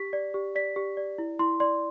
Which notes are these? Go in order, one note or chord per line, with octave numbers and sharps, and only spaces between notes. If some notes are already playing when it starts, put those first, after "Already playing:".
Already playing: G4 B6
D5
G4
D5 B6
G4
D5
E4
E4 C6
D5 C6